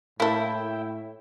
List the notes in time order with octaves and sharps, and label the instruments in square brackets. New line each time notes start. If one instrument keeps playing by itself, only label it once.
[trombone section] A2 [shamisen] A#3 A4 [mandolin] E4 [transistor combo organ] E5 G5